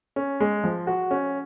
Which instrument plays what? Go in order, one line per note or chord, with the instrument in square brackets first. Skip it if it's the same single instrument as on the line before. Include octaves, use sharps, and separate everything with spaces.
[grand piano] C#4
G#3
F3
F#4
C#4